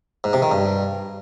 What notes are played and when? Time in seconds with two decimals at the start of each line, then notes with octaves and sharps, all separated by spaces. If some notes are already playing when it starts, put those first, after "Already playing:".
0.24 G#2
0.33 C3
0.42 D#3
0.51 G2